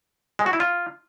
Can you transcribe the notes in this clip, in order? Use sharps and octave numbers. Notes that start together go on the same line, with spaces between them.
G#3
F#4
E4
F4